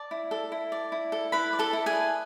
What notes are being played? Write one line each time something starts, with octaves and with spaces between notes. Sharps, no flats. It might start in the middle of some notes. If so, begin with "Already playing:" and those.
Already playing: D5 A5
E4
A4
E4
D5
E4
A4
E4 B4 B5
D5
A4 A5
E4
G#4 G#5
B4